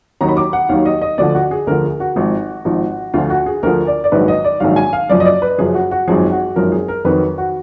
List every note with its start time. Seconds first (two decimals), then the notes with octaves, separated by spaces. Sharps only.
0.21 D#2 D#3 F#3 A#5
0.29 B5
0.37 D6
0.53 F#5
0.69 D#2 D#3 F#3 F5
0.85 D#5
1.02 D#5
1.18 D2 D3 F3 D5
1.35 F#4
1.51 G#4
1.67 D2 D3 F3 A#4
1.83 G#4
2.00 F#4
2.16 G#1 G#2 F3
2.65 G#1 G#2 F3
3.14 D2 D3 F3 F4
3.30 F#4
3.46 G#4
3.63 D2 D3 F3 A#4
3.87 D5
4.04 D5
4.12 A#1 G#2 D#3 F#3 B4
4.28 D#5
4.44 D5
4.60 A#1 G#2 D#3 F#3 F5
4.76 G#5
4.93 F5
5.10 F#1 F#2 F3 D5
5.20 D#5
5.25 D5
5.42 B4
5.58 F#1 F#2 F3 G#4
5.74 F#4
5.91 F#4
6.08 G#1 F#2 F3 G#4
6.32 F#4
6.56 G#1 F#2 F3 A#4
6.72 G#4
6.88 A#4
7.05 F2 D#3 F#3 B4
7.38 F#4